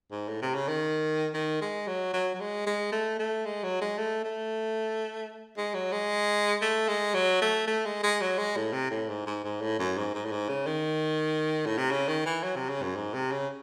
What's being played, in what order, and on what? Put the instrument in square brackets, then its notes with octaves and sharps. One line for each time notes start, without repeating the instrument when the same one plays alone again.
[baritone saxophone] G#2
A2
C3
C#3
D#3
D#3
G#3
F#3
F#3
F#3
G#3
G#3
A3
A3
G#3
F#3
G#3
A3
A3
G#3
F#3
G#3
A3
G#3
F#3
A3
A3
G#3
G#3
F#3
G#3
A2
C3
A2
G#2
G#2
G#2
A2
F#2
G#2
G#2
A2
G#2
C#3
D#3
A2
C3
C#3
D#3
E3
F#3
C3
C#3
F#2
G#2
C3
C#3